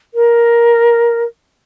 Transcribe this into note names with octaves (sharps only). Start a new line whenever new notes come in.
A#4